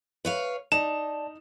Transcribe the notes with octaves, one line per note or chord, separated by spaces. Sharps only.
B4 C#5 F5
D#4 D5 A5 E7